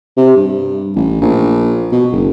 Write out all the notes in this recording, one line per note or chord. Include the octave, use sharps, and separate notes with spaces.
C3
G2
A1
A#1
B2
F#1